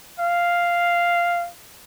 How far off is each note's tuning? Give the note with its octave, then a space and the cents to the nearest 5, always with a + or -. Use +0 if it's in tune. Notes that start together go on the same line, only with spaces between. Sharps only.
F5 -5